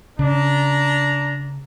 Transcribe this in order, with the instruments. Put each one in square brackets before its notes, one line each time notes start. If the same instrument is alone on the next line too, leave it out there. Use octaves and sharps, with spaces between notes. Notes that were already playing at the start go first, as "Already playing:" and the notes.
[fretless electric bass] C#3 [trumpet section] D4 A#5